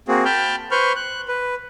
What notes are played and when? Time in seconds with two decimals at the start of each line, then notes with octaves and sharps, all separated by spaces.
0.08 A#3 C4 F#4 G#4
0.25 G5 A5 B5 F6 G6
0.71 B4 C5 B5 C#6 F6 G6
0.96 F#6
1.28 B4